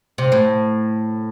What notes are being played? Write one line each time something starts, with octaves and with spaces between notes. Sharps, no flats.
C3
A2